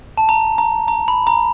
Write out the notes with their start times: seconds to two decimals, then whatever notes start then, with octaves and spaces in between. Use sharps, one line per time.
0.18 A5
0.29 A#5
0.58 A#5
0.88 A#5
1.08 B5
1.27 A#5